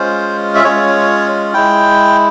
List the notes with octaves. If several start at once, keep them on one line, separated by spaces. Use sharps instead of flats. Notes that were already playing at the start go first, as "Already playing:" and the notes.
Already playing: G#3 C#4 F4 C5
E5
G#3 C#4 F4 C#5
G#3 E4 G5